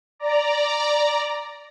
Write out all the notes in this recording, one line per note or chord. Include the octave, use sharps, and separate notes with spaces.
D5 A#5